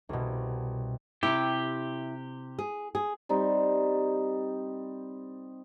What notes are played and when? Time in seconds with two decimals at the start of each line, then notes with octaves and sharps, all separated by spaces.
0.09 C2 B2
1.23 C3 E4 G4
2.59 G#4
2.95 G#4
3.29 G3 C4 D#4